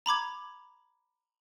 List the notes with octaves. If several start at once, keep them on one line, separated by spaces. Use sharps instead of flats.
A#5 B5 D6 G#6